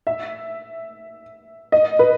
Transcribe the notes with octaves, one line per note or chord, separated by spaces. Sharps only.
E5
D#5
B4